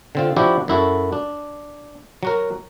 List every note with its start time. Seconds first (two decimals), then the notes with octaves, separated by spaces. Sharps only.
0.15 D3 C4 F4
0.37 F3 D4 E4 F#4 G4
0.68 F#2 E4 F#4 A4
1.12 D4
2.23 F#3 F#4 A#4